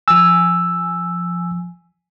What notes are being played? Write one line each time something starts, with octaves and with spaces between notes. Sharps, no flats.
F3 G#5 E6